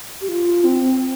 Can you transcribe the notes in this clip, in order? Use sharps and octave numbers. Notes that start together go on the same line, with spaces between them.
G4
F4
C4